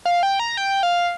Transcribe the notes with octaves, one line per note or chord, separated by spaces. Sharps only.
F5
G5
A#5
G5
F5